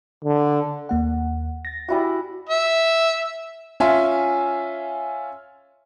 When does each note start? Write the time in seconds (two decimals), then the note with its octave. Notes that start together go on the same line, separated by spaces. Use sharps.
0.24 D3
0.89 D#2 A#3 F#5
1.65 A6 A#6
1.88 G3 E4 F#4
2.49 E5
3.80 C#4 F4 E5 G#5 C6